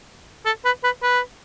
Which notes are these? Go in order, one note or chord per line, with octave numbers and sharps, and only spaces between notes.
A4
B4
B4
B4